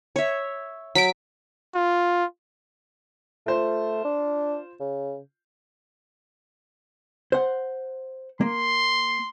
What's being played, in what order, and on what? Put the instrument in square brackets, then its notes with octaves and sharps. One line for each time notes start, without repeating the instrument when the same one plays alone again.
[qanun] C#5 E5
[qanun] F#3 [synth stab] B6 D7
[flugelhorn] F4
[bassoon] A3 [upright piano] F4 C5
[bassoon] D4
C#3
[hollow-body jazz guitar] C5 F#5
[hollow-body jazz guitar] A#3 [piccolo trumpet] C6